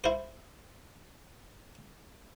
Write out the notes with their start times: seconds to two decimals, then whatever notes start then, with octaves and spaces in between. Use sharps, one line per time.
0.04 E4 C5